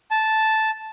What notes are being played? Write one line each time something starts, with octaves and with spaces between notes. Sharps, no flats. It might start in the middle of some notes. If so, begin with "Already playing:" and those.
A5